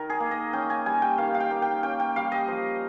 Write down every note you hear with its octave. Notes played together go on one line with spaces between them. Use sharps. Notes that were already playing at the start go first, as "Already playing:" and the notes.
Already playing: D#3 A#4
G#4
A#3
D#5
C#4 G5
G#5
G3 G#5
G5
D#3 F5
F5
G5
A#3
G5
C#4 G5
G5
G3 F5
D#5
F3